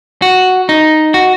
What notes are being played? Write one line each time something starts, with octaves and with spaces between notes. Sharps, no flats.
F#4
D#4
F#4